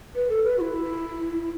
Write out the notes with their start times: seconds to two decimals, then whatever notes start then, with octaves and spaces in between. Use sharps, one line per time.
0.15 B4
0.29 A4
0.44 B4
0.58 F#4
0.61 E4